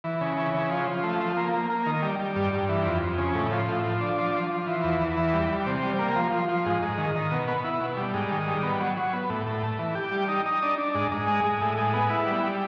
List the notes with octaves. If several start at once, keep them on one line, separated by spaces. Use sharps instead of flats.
E3
C#3
E3
C#3
F3
F3
A3
F3
A#3
A#3
A#3
D#3
G3
G3
G2
G2
E3
F2
F2
C#3
A2
F3
A2
F3
D4
F3
F3
F3
E3
E2
E2
E3
G3
G3
C3
G3
A#3
F3
F3
F3
G#2
G#2
D#3
D#3
B2
B3
E4
B2
G3
G#2
D#3
G3
B3
F#3
F#3
B3
A2
A2
A3
E3
G4
G3
D#4
D#4
D4
D4
G#2
G#2
G#3
G#3
A2
G#3
B3
E4
G3
G3